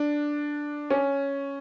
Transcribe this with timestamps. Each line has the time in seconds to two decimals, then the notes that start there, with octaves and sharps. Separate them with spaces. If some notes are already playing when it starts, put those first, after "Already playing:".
Already playing: D4
0.90 C#4